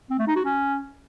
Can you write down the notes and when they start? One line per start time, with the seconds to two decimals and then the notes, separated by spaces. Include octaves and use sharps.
0.10 C4
0.19 A3
0.27 D#4
0.36 F#4
0.45 C#4